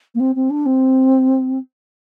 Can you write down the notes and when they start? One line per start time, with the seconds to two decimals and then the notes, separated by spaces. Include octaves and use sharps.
0.15 A#3
0.20 C4
0.35 C4
0.50 D4
0.66 C4